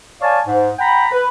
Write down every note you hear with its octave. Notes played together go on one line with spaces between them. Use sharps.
C#5 D5 F5 G#5 A5
G#2
F#5 G5 A#5 B5
B4